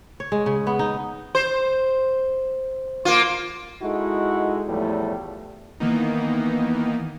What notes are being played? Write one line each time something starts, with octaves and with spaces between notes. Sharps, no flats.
C#5
G#3
C#3
B3
D#4
C5
A#3 F4
G#3 D#4 E4 F#4 A4
E2 A2 F3 G3 A3
D#3 E3 A#3 B3 D#4